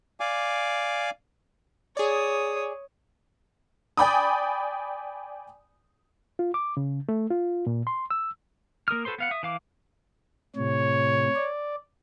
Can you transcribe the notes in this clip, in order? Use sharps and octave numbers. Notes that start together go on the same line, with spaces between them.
D5 F5 G#5 D6
G#4 C#5 D5 D#6
D5 G5 G#5 B5 D6 D#6
F4
D6
C#3
A3
F4
A#2
C6
E6
A#3 A#4 D#6 F6
F#4 A4 B4 C5 C6
B3 F5 F#5
E5 D#6
E3 F5 D6
A2 C3 C#5
D5